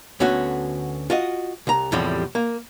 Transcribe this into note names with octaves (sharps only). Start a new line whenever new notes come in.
D2 D3 B3 C#4 F#4
F4 F#4 D#5
C2 A#5
E2 A2 C3 F3 G3
A#3